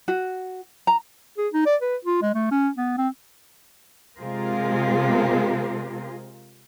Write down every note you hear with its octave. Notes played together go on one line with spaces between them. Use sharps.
F#4
A#5
G#4
D#4
D5
B4
F4
G#3
A3
C#4
B3
C4
C3 G#3 F4 G#4 A#4 C5